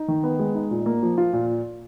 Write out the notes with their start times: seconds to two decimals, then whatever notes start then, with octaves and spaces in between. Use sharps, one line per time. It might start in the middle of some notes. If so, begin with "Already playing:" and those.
Already playing: D#4
0.08 D#3
0.24 B3
0.39 G#3
0.55 D#4
0.71 A#2
0.86 A#3
1.03 F3
1.18 F4
1.33 A#2